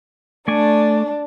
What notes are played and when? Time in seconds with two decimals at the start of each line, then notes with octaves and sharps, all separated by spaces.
0.48 A3 D4 D5 G#5